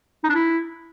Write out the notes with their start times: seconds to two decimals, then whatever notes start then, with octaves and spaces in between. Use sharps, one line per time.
0.24 D#4
0.29 D4
0.35 E4